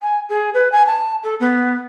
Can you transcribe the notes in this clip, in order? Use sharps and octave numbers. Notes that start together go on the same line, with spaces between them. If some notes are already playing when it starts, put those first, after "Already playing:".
G#5
G#4
B4
G#5
A5
A4
B3